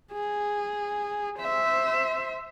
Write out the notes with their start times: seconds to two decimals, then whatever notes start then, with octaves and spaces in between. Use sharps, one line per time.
0.12 G#4
1.39 C5 E5